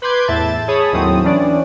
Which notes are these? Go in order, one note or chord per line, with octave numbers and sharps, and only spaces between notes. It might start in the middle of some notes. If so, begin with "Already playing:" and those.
B4 B5 C6 D6 G6 G#6
E2 A2 E5 A5 A6
G#4 C#5 A5 B5 D#6
D#2 A2 F#3 C4 D#6
E3 C#4 D4 D5